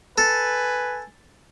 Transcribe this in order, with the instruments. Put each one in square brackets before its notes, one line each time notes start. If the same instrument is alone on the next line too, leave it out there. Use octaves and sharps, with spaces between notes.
[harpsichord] A4 [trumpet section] B4 G#5